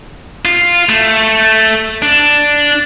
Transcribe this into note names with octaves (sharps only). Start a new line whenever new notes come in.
F4
A3
D4